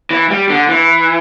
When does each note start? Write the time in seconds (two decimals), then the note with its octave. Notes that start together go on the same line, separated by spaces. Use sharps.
0.11 E3
0.30 G3
0.50 D3
0.69 E3